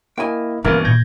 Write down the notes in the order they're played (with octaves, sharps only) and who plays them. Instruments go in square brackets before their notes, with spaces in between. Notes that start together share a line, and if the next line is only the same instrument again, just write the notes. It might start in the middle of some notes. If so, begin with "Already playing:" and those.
[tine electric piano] A#3 E4 D#5 [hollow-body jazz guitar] G5 G#5
[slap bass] G2 B2 [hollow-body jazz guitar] E3 [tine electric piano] A#3 F#4 A#4 [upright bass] C#4
[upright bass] A#2 [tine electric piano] G6 G#6 A#6